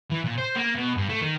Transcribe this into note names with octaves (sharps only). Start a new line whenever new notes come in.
E3
A#2
C5
A#3
B2
G2
A3
D#3